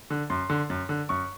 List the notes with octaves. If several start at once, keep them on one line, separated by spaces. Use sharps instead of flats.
D3
F#2 C6
D3
F#2
D3
F#2 C#6